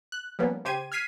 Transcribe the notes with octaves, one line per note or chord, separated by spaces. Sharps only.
F#6
F3 G3 A#3 B3 C#4
C#3 G4 C5 G#6 D#7
F6 G#6 B6 C7 D#7